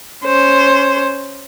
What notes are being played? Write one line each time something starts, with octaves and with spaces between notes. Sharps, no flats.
C#4 C5